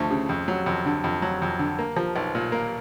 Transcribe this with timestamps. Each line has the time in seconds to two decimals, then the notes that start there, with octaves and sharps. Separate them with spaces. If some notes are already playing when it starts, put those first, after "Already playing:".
Already playing: D2 F3 A3
0.11 C#3
0.29 F2
0.48 F#3
0.66 F2
0.86 D3
1.04 F2
1.22 F#3
1.42 F2
1.59 D3
1.79 A#3
1.97 F3
2.16 B1
2.35 A#2
2.52 A#3